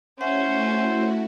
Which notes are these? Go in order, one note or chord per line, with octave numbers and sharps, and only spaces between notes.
A3 C#4 E4 F#4 C5 E5 F#5